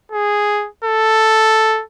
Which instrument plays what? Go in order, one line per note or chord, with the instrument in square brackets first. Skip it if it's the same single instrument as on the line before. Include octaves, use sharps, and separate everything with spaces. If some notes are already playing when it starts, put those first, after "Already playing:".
[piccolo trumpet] G#4
A4